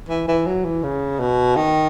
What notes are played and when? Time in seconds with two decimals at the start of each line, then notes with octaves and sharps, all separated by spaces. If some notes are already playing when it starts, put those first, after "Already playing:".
0.09 E3
0.28 E3
0.47 F#3
0.65 E3
0.83 C#3
1.20 B2
1.56 D#3